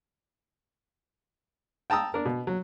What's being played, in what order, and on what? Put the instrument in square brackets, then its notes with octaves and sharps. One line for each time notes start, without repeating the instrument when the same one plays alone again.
[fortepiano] G5 A5 A#5 D#6 E6
D4 A#4
B2
F#3